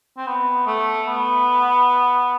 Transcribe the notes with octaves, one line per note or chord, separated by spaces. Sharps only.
C4
B3
A3
B3